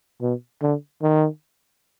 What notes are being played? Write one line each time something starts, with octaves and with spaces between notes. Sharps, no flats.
B2
D3
D#3